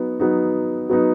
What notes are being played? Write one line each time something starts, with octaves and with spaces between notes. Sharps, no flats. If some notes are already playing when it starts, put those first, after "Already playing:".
Already playing: F#3 B3 D#4
F#3 B3 D#4
F#3 B3 D#4